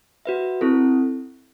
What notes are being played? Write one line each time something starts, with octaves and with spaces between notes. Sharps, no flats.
F#4 B4 E5
C4 E4 A4